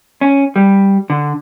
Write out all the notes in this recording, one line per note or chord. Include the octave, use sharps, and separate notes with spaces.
C#4
G3
D3